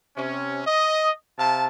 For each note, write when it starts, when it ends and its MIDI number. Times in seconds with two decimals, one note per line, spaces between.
0.17 0.61 48
0.17 0.61 61
0.66 1.10 75
1.38 1.68 48
1.38 1.68 77
1.38 1.68 81